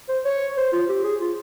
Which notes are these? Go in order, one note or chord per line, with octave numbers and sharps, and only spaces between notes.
C5
C#5
C5
F4
G4
G#4
F4